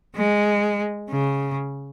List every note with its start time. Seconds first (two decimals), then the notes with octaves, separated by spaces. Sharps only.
0.16 G#3
1.10 C#3